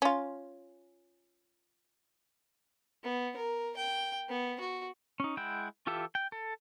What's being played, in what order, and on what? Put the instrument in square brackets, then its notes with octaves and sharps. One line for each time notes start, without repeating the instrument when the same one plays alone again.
[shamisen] C#4 F4
[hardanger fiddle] B3
A#4
G5
B3
F#4
[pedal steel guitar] C#4 D#4
G#3 E4 F#5 G5
E3 F4 G4 A4 E5
G5
A4